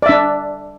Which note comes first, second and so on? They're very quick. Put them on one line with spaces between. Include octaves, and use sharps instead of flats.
D5 E5 D4